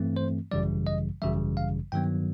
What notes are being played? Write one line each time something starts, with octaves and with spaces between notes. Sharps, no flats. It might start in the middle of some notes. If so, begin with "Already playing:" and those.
Already playing: G2 E3 A3 C4
C5
G#1 F#2 C#3 E3 G3 D5
D#5
G#1 F#2 C#3 E3 G3 E5
F5
G2 D#3 F#3 B3 G5